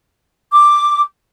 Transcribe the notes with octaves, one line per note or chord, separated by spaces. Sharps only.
D6